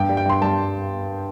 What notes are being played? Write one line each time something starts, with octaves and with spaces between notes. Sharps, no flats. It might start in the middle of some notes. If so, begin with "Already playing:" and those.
Already playing: G2 G5
G3
G5
G2 C6
G3 A5